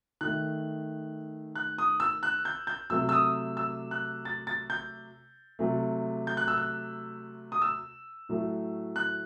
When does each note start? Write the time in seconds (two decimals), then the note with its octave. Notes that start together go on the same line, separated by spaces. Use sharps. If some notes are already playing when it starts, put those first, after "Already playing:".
0.21 D#3 A3 F#6
1.55 F#6
1.78 D#6
2.00 E6
2.23 F#6
2.45 G6
2.67 G6
2.90 C3 F#3 A3 E6
3.09 E6
3.12 D#6
3.57 E6
3.91 F#6
4.25 A6
4.47 A6
4.70 G6
5.59 C3 F#3 A3
6.27 G6
6.37 F#6
6.48 E6
6.58 F#6
7.52 D#6
7.62 E6
8.29 A2 F#3 A3
8.96 F#6